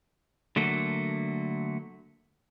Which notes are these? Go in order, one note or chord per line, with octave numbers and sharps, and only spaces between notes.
D3 F#3 A3 A#3